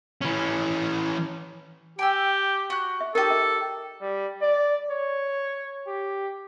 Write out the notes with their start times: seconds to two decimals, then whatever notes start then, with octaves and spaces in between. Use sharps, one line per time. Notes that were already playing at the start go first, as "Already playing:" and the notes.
0.21 E3 C#4
1.99 G4 G5 G#5 E6
2.70 F#4 F#6
3.01 E5
3.15 D#4 G4 A4 A#4
3.30 E5
4.01 G3
4.41 D5
4.90 C#5
5.87 G4